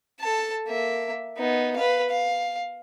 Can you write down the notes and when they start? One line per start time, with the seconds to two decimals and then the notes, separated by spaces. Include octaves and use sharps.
0.20 A4 A5
0.67 A#3 E5
1.37 B3 D#4
1.76 B4 F5
2.09 F5